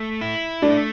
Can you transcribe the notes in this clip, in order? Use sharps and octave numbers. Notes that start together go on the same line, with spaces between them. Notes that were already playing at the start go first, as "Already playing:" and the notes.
Already playing: A3
E4
A3 D4